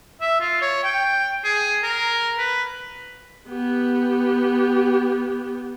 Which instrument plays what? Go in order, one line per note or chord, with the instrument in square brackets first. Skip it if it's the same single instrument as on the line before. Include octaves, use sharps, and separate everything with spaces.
[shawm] E5
F4
C#5
G5
G#4
A#4
B4
[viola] B3 G4